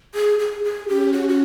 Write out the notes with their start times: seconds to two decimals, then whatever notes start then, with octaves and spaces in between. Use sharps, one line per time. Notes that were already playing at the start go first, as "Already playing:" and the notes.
0.15 G#4
0.39 G#4
0.64 G#4
0.88 C#4 G4
1.13 F#4
1.28 F#4